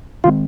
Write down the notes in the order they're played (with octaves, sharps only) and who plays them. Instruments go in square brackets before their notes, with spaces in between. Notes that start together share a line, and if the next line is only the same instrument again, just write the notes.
[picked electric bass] D#3 G#3 C4 [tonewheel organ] F4